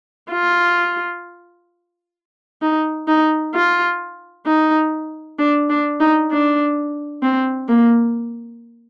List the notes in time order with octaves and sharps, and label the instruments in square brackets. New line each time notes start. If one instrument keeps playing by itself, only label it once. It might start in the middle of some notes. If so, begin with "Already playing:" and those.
[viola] F4
D#4
D#4
F4
D#4
D4
D4
D#4
D4
C4
A#3